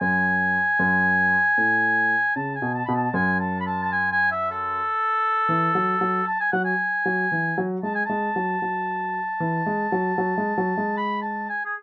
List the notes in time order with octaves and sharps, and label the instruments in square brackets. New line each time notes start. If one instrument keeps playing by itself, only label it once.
[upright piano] F#2 [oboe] G#5
[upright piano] F#2
A2
[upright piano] C#3 [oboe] A5
[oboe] G#5
[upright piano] B2
[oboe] A5
[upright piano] B2 [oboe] B5
[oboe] A5
[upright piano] F#2 [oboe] G#5
[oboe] A5
B5
A5
A5
G#5
G#5
E5
A4
[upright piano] E3
F#3
F#3
[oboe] A5
G#5
[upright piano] F#3 [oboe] F#5
[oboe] G#5
[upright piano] F#3
E3
F#3
[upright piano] G#3 [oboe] A5
[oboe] G#5
[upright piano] G#3 [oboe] A5
[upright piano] F#3
F#3
E3
G#3
F#3
F#3
G#3
F#3
G#3
[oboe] B5
A5
G#5
G#4